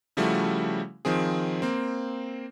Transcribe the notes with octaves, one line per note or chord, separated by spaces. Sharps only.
C#3 F3 G3 A3 E4 F#4
D#3 F3 C4 G#4
A#3 C4